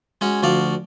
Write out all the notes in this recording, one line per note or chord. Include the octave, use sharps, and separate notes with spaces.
G#3 C#4 F#4
D2 F3 F#4 D5 F5